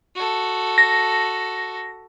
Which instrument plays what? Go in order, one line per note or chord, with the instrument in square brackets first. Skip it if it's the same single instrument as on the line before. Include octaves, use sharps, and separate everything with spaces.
[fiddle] F#4 A4
[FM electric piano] A#6